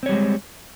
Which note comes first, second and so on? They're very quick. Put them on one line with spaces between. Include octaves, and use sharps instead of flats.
C4 C#5 G3 G#3